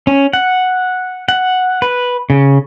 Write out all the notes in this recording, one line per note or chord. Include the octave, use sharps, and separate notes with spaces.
C#4
F#5
F#5
B4
C#3